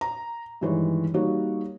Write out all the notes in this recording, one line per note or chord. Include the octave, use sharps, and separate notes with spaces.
A#5
G2 D#3 E3 G#3 C#5
G3 A#3 D#4 F#4 C#5